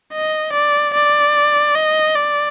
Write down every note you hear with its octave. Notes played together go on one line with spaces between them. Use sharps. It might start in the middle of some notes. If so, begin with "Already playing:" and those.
D#5
D5
D5
D#5
D5